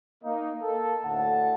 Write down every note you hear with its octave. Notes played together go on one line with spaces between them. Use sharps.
A#3 D#4
A#3 A4
D2 A2 D3 F#5 A5